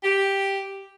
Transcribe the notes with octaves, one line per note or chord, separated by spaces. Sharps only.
G4